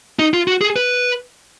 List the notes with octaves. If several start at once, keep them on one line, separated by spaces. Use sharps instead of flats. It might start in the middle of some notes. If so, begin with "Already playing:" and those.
D#4
F4
F#4
G#4
B4